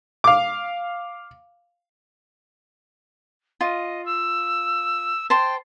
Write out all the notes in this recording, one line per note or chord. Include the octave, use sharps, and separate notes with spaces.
F5 D6
F4 D#5
E6
C5 G5 A5 C6